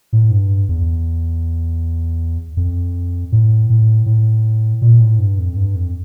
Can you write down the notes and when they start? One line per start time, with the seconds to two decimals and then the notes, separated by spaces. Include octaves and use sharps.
0.13 A2
0.31 G2
0.69 E2
2.57 F2
3.32 A2
3.70 A2
4.06 A2
4.82 A#2
5.00 A2
5.19 G2
5.39 F2
5.57 G2
5.75 F2